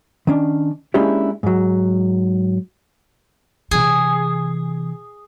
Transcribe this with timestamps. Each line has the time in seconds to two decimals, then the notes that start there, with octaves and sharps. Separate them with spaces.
0.27 D#3 C#4 D4
0.94 G#3 A#3 C#4 D4 E4 G4
1.43 G#2 F#3
3.71 C3 E3 G#4